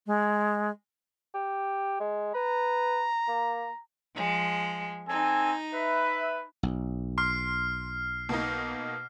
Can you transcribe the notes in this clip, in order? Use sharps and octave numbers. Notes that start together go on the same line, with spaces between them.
G#3
G4
G#3
B4 A#5
A#3
F3 G#3
C4 D#4 A4 G#5
B4 E5
B1
C6 F6 C7
B2 A#3 D#4